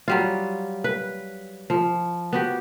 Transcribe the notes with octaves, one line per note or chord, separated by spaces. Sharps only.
F#3 G3 F4
B4
F3
B3 F#4 G4